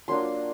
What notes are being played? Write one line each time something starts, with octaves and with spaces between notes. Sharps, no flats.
F#3 A#3 D4 F4 C6